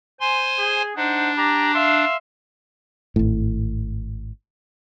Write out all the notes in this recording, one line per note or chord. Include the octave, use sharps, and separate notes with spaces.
C5 G#5 C6
G#4
D4 D#4 C5 F#5
G4 D5 A#5
E5 F5 C6
G#1 A2